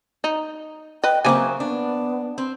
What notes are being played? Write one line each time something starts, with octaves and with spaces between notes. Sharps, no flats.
D#4
B4 D#5 G5
C#3 F#3 A#3 C4 C5 E5 G#5
B3 D4
C4